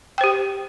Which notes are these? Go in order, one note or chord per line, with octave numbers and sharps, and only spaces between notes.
G4 C5 G5